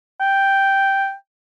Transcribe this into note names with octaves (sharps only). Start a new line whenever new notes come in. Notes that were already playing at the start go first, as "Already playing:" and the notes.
G5